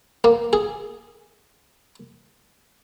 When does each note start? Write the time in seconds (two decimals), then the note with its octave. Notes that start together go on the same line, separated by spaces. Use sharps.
0.24 A#3
0.53 G#4